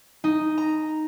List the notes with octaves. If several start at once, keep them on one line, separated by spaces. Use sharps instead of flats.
D#4
A#5